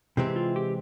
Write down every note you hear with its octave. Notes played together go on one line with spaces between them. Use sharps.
C3 E3 G#3 C4 G4
F4
G4